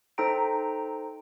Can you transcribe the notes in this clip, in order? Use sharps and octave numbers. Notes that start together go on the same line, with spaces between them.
D#4 A4 C5 G5 A#5 D7